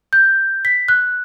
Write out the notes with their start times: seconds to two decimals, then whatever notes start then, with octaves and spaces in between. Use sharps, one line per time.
0.13 G6
0.65 B6
0.88 F#6